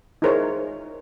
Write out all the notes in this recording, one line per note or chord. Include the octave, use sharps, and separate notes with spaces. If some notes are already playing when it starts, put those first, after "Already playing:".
D#4 E4 G#4 A#4 C5 C#5